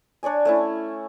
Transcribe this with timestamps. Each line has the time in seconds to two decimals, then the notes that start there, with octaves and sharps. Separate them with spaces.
0.23 D4 C#5 D5 G#5
0.45 A3 C#4 E4